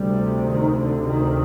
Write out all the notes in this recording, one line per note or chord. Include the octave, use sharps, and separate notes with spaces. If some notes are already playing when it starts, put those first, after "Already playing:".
Already playing: D2 C3 G3
D#3
D3
D2 C3 D#3